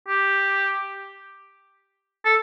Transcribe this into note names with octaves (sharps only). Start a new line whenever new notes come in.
G4
A4